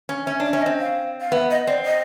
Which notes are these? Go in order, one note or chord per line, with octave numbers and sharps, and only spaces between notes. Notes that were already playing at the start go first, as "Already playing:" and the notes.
C#4
C#4 E5
D4 E5
C#4 E5
D#5
C4
F5
F5
B3 E5
D#5
C4 D5
D#5